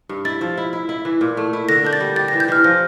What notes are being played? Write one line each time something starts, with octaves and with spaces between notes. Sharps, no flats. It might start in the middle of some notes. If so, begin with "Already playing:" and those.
G2
E4 A6
F3
E4
E4
E4
E3
A#2
A3
E4
D3 A#6
D4 G6
A6
G3
G4 A6
A#6
E3
G6
E3 F6
F3 A#6